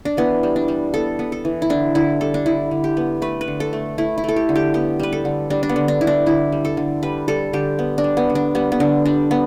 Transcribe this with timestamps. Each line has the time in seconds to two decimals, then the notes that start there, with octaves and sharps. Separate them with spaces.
0.05 D4
0.17 E3 B3
0.43 G3
0.56 D4
0.68 G3
0.94 B3 A4
1.19 B3
1.32 A4
1.45 E3
1.62 E4
1.70 D3 D4
1.95 D3 E4
2.21 G3 A4
2.34 D4
2.46 D3 E4
2.71 D3
2.84 G4
2.97 B3
3.22 A3 B4
3.41 B4
3.48 D3
3.60 A4
3.73 A3
3.98 A3 E4
4.18 E4
4.24 A3 A4
4.36 G4
4.49 D3
4.56 G4
4.74 B3 G4
5.00 G3 B4
5.13 A4
5.25 D3
5.50 G3 D4
5.63 D4
5.69 B3
5.76 D3
5.88 D4
6.01 D3 E4
6.07 D4
6.26 D3 E4
6.52 G3
6.65 A4
6.77 D3
7.03 G3 B4
7.28 G3 A4
7.53 D3 G4
7.79 B3
7.98 D4
8.04 G3
8.17 B3
8.30 D3
8.35 D4
8.55 G3 B3
8.72 B3
8.80 D3 D4
9.05 G3 D4
9.31 B3